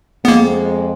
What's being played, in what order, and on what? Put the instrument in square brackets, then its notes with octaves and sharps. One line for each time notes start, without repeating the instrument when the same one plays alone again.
[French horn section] F2 G#3 [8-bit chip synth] A#3 B3